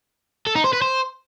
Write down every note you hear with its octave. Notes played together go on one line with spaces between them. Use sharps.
A4
D#4
C5
B4
C5